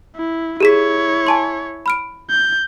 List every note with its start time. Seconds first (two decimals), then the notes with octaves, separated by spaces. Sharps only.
0.16 E4
0.60 E4 G4 G#4 C#5 B6
1.27 G#5 A5 C6
1.86 B5 F6 D7
2.30 G6